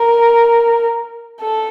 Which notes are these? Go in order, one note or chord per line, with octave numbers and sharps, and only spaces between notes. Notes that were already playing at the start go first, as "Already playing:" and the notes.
Already playing: A#4
A4